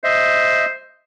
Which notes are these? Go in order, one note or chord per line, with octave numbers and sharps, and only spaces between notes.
C5 D#5 E5